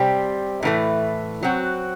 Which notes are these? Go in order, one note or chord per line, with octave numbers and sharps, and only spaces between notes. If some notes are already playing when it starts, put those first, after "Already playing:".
Already playing: C3 G3 C4
A2 E3 A3
F#3 C4 F#4